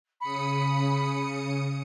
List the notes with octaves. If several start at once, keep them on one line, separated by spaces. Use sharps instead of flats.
C#3 B5 D#6 C#7